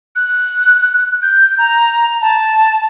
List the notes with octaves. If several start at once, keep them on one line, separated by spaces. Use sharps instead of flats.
F#6
G6
A#5
A5